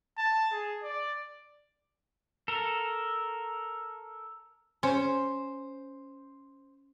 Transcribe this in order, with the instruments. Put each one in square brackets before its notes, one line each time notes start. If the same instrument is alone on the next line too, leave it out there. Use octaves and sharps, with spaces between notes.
[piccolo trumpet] A5
G#4
D5
[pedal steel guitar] A4 A#4
[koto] C#4 [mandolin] C5